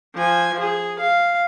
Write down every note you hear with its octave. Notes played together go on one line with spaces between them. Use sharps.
F3 G#5
G#4
F5